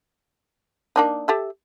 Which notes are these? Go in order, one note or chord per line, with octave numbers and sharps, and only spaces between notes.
A#3 D4 D#4
G4 A4 E5